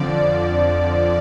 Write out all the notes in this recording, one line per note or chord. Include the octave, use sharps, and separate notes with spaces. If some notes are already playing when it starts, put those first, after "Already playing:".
Already playing: F2 D3 F3 D5